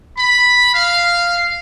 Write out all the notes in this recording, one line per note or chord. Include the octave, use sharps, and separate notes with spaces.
B5
F5